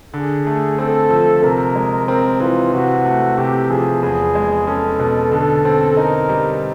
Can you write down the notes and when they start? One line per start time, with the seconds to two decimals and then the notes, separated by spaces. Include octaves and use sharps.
0.13 D3 G#4
0.47 A3
0.78 C4 A4
1.10 F3
1.43 C3 A#4
1.76 G#3
2.08 C4 A#4
2.40 E3 F4
2.73 C3 F#4
3.05 A3
3.38 C3 G4
3.70 F3 G#4
4.02 E2 G#4
4.35 G#3
4.67 C#4 A4
4.99 B2
5.32 D3 A4
5.65 C4
5.97 D#4 A#4
6.29 G3